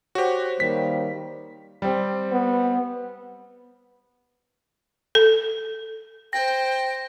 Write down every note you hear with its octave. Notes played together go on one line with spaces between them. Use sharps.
F#4 G4 C5 C#5
D#3 G3 A#3 B6
G3 C4
B3
A4
C5 G5 A#6